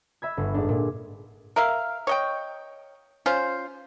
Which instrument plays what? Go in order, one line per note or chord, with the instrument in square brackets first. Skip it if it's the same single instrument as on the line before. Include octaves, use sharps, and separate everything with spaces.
[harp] E5 B5 G#6
G1
G#2 D4
A#2
[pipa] A#4 E5 F5
C#5 D#5 G5
C#4 F4 C5